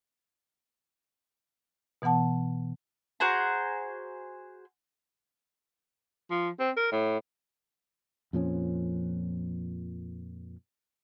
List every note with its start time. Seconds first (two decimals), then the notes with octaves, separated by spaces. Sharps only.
2.02 B2 E3 B3 F#5 A5
3.20 F#4 G#4 C5 A#5
6.31 F3
6.59 C4
6.77 A#4
6.92 A2
8.33 F2 A#2 F3 C#4